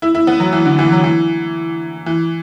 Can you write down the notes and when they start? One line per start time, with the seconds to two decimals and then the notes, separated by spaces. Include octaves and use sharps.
0.02 E4
0.15 E4
0.27 B3
0.40 F#3
0.53 E3
0.66 D3
0.79 E3
0.92 F#3
1.04 E3
2.06 E3